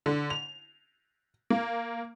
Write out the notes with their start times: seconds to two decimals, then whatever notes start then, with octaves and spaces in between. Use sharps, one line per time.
0.06 D3
0.30 F7
1.50 A#3